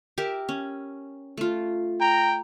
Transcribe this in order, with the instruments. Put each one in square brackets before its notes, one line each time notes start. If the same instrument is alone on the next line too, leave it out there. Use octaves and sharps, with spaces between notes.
[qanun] G4 A#4 E5
C#4
A3 F4
[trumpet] G5 [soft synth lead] A#5